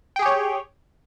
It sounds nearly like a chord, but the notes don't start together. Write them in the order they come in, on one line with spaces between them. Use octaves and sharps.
G5 G#4 G4 C#5